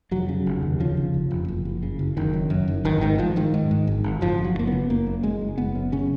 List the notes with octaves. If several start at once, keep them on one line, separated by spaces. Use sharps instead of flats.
F1 F#3
C#3
F1
D#2
C#3 F3
F1
F1
F1
F#1
F#1
C#3
F#1
F#1 D#3
F#2
F#2
F#1
G#1 D#3
G#2 D#3
G#2 F3
G#2 D#3
G#2
G#2
G#1
G#1
F#1 F3
F#1
F#3
F#1 A#3
C#3 B3
F#1 A#3
F#2
F#1 G#3
F#1
F#1 B3
F#2
C#3 C#4